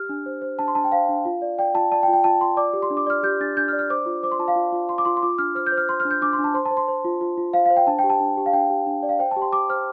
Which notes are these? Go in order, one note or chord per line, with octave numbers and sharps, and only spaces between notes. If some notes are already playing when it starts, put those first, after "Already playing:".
Already playing: G4 F6
D4
C5
C5
D4 A5
C6
D4 A5
G5
C5 F5
D4
F4
D5
D5 G5
F4 A5
D5 A5
G5
F4
G5
F4 A5
F4 C6
D5 D6
G4
C6
D4
D6
D5 F6
G4 G6
D4 A6
D4 G6
F6
D5
F6
C5 D6
F4
C5 D6
C6
F4 A5
F5
F4
F4
F4 C6
D6
F4 C6
C6
F4 D6
D4 F6
C5 F6
G6
C5
F6
C5 C6
F6
D4
G6
D4 D6
C6
D4
A5
C5 C6
A5
C5
C6
C5
F4
F4
F4
C5 F5
F5
C5
G5
D4 A5
G5
G4
A5
D4
G4
F5
D4 G5
G4
D4
D5
F5
C5 G5
A5
G4
C6
G4 D6
C5 F6